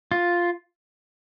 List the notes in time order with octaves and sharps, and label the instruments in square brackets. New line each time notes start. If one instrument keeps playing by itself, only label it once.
[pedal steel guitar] F4